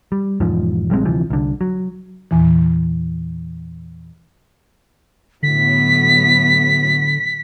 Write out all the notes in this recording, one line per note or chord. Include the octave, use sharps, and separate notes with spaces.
G3
E1 E2 G#2 F3
A#1 G3 G#3 C4
D2 C3 E3 F3
C2 D3
F#3
E2 A#2 E3
A2 D3 F#3 B3 B6